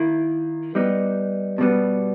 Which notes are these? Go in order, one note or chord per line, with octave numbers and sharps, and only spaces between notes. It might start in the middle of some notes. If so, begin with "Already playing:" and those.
Already playing: D#3 A#3 E4
G3 B3 D#4
B2 G3 B3